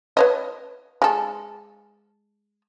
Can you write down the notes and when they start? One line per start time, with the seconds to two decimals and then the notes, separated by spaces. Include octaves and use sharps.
0.17 B4 C#5 D#5
1.02 G#3 A4